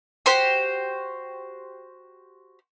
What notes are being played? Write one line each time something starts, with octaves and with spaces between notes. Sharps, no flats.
F#4 G4 C5 C6